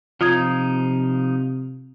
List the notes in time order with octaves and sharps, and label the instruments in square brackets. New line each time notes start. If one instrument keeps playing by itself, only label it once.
[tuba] C3 [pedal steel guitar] F3 D#4 D#6 [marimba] F4 G#6